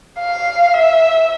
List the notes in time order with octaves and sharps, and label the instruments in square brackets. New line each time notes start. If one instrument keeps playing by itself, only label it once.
[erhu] F5
E5